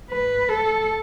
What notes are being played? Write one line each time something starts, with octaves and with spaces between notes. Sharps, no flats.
B4
A4